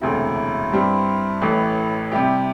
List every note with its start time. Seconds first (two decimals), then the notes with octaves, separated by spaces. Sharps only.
0.01 E1 D2 C3 E4
0.72 G2 G3 C4
1.42 A1 A2 E3
2.12 C3 G3 E4 G4